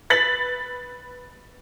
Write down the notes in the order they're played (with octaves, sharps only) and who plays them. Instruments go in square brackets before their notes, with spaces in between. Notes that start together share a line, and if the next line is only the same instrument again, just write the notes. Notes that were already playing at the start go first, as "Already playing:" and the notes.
[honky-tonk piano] B4 A6 B6 F#7